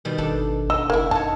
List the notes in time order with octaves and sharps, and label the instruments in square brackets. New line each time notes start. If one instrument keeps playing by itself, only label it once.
[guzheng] B2 D#3 G3
[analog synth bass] G#1 [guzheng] D4 A4
[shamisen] D#5 [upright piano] E6
[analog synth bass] F#1 [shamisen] A#3 E4
[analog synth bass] F#2 [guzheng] D#4 C#5 [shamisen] A5